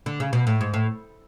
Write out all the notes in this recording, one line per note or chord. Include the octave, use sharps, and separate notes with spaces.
D3
C#3
B2
A2
G#2
A2